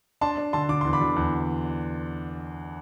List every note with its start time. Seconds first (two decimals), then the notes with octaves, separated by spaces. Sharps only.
0.21 D4 A5 C6
0.37 D4
0.53 D3 A5 C6
0.69 D3 D6
0.81 E2 C6
0.93 B5 D6
1.01 D3
1.16 E2